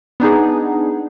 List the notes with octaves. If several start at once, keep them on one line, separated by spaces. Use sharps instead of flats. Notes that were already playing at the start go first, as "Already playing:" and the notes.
B3 D4 D#4 G#4